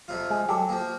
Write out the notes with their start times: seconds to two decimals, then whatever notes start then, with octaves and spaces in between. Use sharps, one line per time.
0.08 F2 C3 F4
0.30 G#3
0.49 F#3 G4 A4
0.69 F3 A#3